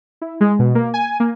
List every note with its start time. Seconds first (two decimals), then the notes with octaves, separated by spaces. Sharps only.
0.22 E4
0.41 G#3
0.59 B2
0.75 A#3
0.94 G#5
1.20 A#3